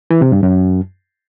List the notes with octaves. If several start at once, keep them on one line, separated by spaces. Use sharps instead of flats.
E3
C3
G2
F#2